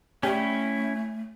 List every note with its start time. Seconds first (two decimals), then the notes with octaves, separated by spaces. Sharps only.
0.23 A3 C#4 E4 G4 C#5 D5